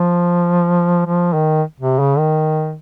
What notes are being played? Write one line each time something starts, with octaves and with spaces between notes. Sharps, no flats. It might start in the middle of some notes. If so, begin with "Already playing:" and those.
Already playing: F3
F3
D#3
C3
C#3
D#3